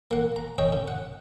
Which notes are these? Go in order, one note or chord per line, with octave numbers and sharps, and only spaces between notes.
A#3 F#5
A#5
C#5 D#5 G5
C#3
F#5